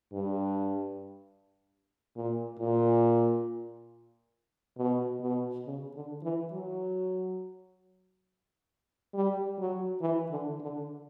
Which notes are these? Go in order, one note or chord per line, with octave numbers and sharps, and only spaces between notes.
G2
A#2
A#2
B2
B2
C#3
D3
E3
F#3
G3
F#3
E3
D3
D3